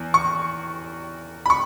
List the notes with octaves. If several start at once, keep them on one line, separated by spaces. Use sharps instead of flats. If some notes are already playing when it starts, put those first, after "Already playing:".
Already playing: E2
C#6
B5
C#6